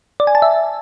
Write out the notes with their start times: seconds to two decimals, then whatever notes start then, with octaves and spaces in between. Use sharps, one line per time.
0.20 D5
0.27 G#5
0.35 A5
0.42 E5